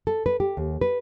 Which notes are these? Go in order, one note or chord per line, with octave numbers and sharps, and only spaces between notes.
A4
B4
G4
D#2
B4